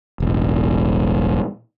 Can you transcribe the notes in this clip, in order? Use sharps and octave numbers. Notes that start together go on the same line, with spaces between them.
E1 A1